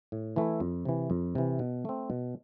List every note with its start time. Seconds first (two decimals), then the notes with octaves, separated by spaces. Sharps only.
0.12 A2
0.36 E3 A3 E4
0.60 F2
0.85 C3 E3
1.10 F2
1.35 C3 E3
1.59 B2
1.85 A3 C4
2.10 B2